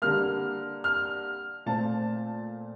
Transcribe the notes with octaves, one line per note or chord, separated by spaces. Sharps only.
D3 G3 A#3 F6
F6
A#2 A3 C4 A5